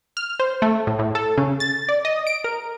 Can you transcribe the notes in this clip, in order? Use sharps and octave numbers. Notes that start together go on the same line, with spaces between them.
F6
C5
A3
A2
A2
A4
C#3
A6
D5
D#5
D7
A#4